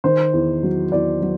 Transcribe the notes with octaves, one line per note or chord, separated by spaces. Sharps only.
D#3 C5
E2
F#3
E2 D5
F#3